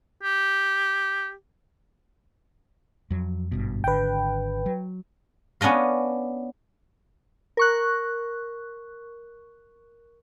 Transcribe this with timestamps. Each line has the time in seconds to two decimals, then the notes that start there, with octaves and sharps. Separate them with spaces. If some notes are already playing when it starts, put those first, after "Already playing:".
0.23 G4
3.10 F2 F#3
3.52 G#1 G2 B2
3.84 G#1 D3 B4 G5
4.66 F#3
5.61 B3 C#4 D4 D#5 F5
7.57 A#4 C#6 F#6